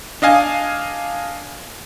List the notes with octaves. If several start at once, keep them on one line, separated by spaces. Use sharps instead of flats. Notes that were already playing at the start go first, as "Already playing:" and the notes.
D4 D#5 F5 G#5